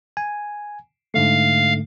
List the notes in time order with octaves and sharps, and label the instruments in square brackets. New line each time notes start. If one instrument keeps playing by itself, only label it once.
[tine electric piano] G#5
[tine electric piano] G#2 D3 A3 [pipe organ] F5